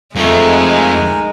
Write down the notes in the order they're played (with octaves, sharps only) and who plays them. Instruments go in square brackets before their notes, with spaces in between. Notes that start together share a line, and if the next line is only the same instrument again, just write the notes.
[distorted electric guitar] F2 [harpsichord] F3 A3 [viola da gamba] G#3 [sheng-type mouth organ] D#4 A#4 G#5